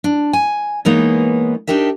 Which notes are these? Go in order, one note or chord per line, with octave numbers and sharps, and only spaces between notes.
D4
G#5
E3 G#3 A#3 B3 D#4 C#5
D4 D#4 G4 A#4 E5